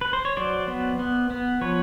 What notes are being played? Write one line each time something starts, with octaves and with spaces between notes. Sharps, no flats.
B4
C5
C#5
F#3 C5 D5
B3
B3
B3
F3 B4 C#5